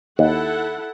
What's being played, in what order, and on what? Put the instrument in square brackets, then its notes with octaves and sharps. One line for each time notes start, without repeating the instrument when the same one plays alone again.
[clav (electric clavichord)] D#2 [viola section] E4 A4 F#5